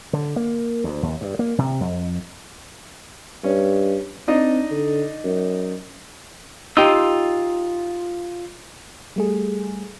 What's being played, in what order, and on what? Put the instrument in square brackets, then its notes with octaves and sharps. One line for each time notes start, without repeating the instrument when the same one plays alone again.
[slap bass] D3
A#3
D2
D#2
G2
A#3
C3
F2
[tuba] G2 [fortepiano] C#4
[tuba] C4 [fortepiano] D4 D#4 D#5
[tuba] D3
F#2
[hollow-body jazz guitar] D#4 G4 [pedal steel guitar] F4 C6 E6
[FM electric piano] G3 A3 G#4